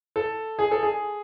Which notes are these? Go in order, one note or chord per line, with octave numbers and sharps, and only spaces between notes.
A4
G#4
A4
G#4